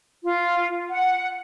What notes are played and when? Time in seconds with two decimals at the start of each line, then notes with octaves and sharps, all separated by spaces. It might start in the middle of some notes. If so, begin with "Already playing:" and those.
0.24 F4
0.90 F#5